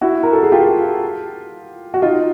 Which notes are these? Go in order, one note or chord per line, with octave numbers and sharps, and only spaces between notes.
E4 F#4
A#4
A4
G#4
F4 G4
F#4
D#4 F4